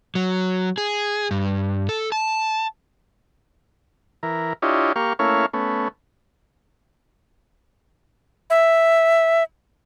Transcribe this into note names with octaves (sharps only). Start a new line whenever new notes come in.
F#3
G#4
G2
A4
A5
E3 A#4
D4 E4 F4 G4 C#5 D#5
A#3 G4 F5 C#6
A3 A#3 C#4 E4 C#5 F5
A3 B3 C#4
E5